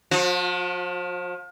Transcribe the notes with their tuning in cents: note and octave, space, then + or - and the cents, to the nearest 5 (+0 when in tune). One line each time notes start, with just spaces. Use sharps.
F3 +30 F#4 -40